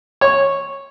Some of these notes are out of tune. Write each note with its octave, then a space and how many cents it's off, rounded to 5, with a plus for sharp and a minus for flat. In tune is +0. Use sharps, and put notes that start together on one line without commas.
C#5 -10